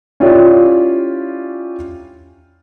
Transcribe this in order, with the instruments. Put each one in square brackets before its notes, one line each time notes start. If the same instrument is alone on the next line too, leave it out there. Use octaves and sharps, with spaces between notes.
[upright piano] C#4 E4 F4 G4 D5